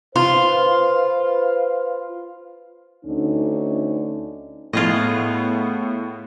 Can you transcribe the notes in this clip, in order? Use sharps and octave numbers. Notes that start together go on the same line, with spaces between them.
F4 B4 C5 F5
D2 D3 C#4 D#4
A2 B3 F4 G#4 D#5